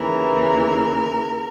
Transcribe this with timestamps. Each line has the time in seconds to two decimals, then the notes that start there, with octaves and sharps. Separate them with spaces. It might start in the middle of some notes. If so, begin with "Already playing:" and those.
Already playing: D#2 C#3 E3 A#4